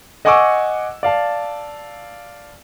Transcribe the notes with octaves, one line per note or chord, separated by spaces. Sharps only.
D#5 F#5 G#5 C#6 D6 E6
D5 F5 A5